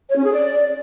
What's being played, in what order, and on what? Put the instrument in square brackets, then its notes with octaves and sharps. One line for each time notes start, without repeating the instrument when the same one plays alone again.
[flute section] C#5
C#4
G#4
D5